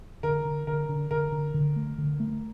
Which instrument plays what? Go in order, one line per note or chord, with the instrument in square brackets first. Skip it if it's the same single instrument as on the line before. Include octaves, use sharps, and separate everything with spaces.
[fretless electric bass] D3 [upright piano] A#4
[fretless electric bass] D3
[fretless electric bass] D3 [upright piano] A#4
[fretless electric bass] D3
[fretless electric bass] D3 [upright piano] A#4
[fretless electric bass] D3
D3
A3
D3
A3